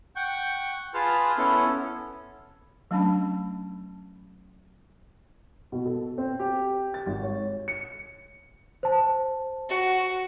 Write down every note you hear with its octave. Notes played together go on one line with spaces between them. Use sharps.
F#5 G5 C#6 G6
F4 G#4 B4 A5 C6 F6
B3 C#4 E4 A4
F#3 A3 C#4 D4 A5 B5
B2
A4
C4
G4
A6
G#1
C#5
C#7
C5 A5
F#4